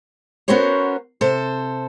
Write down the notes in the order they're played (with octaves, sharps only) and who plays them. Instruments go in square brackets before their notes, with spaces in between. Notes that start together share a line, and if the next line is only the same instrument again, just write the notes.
[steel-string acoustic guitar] B3 C#4 F#4 A#4 C5 C#5
C3 A4 C5